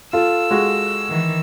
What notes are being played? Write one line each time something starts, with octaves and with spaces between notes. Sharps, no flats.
F4 A4 E6
G#3 F#4
D#3 E3